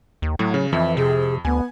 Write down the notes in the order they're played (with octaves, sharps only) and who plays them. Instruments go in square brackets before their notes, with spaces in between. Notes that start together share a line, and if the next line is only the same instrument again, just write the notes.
[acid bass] D#2
[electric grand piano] A2 [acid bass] F#3
[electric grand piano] C#3
[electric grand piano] F2 [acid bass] E3 [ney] E5
[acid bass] C3 [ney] G#4
[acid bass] D2 [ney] B3 [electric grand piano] G#5